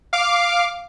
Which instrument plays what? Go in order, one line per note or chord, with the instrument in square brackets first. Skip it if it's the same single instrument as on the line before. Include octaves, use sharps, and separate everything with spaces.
[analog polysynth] F5 D6